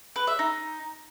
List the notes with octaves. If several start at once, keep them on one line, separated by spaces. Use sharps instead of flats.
B4
E5
D#4